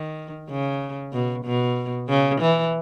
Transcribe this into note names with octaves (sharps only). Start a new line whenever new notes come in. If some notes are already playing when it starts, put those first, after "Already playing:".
Already playing: D#3
C#3
B2
B2
C#3
E3